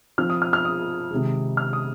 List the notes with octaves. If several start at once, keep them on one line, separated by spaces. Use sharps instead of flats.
F3 C4 F6
D#6
F6
F6
D#6
C3 D#3 G#3
F6
D#6